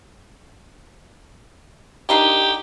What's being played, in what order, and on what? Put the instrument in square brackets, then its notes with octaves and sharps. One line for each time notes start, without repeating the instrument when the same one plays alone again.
[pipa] D4 D#4 G5 [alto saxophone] G4